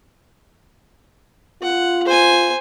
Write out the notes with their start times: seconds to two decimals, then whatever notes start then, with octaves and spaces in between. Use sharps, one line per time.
1.63 F4 F#5
2.05 C5 G#5